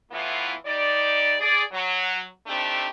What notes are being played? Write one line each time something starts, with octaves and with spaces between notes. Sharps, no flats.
A2 E3 B3 E4 F4
G3 D#4 D5
G#4 D5
F#3
A3 C4 D4 D#4 G4